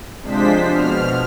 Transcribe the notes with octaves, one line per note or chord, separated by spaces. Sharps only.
C3 F3 G#3 D4 C5 B6
B2 F6